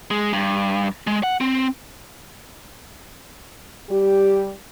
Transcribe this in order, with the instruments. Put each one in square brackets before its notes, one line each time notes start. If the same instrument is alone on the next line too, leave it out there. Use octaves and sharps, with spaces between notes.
[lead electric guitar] G#3
G2
G#3
F#5
C4
[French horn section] G3 G4